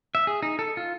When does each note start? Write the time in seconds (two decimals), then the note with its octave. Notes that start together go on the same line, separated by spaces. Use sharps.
0.15 E5
0.27 G#4
0.43 D#4
0.59 A4
0.77 F4